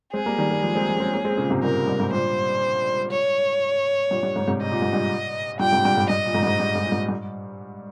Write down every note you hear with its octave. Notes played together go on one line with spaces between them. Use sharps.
G#3 C4 G#4
G3 A#3
D#3 G3
G3 A#3
F3 G#3
G#3 C4
F3 G#3
C#4
G#3 C4
A#3 C#4
G#3 C4
A#2 C#3
G#2 C3
G2 A#2 A#4
G2
G#2
G2 A#2 C5
C#5
G2 A#2
G2
G#2
G#2 C3
C3 D#5
A#2
G#2
G2 A#2
G2 A#2 G5
G#2 C3
G2 A#2
G#2
G2 D#5
A#2
G#2
G2
G#2
G2
G#2
A#2
G#2
G2